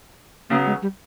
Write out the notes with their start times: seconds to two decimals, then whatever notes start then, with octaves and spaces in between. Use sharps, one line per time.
0.50 C#3 F#3 A#3 B3
0.66 G#3
0.82 G3